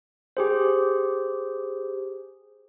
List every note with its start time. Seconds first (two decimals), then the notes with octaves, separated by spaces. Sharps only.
0.37 G4 G#4 C5